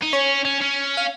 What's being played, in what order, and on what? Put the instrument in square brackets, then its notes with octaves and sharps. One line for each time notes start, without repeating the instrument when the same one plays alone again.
[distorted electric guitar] D#4
[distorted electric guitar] C#4 [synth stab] C#5
[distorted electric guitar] C#4
C#4
[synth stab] F5